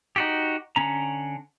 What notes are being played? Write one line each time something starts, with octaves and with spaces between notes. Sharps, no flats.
D#4 F#4 G4
D3 C#4 A#5